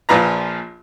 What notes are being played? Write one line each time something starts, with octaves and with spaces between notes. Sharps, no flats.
A#1 A#2 F3 F4 B4 A#5